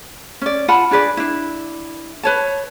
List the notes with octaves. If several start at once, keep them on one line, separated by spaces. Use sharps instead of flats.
C#4 D5
F4 F#5 A5 B5
D4 G#4 B4 D5
D4 E4
B4 C#5 A5